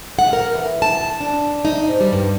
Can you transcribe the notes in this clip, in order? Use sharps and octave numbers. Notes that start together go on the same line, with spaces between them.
F#5
A#4
E3
A5
D4
D#4
G#2
G3
G2